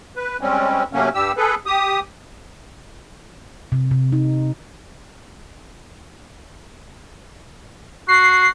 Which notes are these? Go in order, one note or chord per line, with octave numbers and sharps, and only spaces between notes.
B4
G3 G#3 C4 C#4
C3 F#3 A3 A#3 C#4
G2 G3 G4 E6
G#4 A4 B4
G4 D#6
C3
C3
D#4
F#4 C7